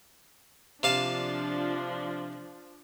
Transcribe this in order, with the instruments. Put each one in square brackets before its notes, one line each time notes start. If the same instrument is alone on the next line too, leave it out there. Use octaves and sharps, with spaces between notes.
[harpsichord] C3 F5 A5 [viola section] F3 D4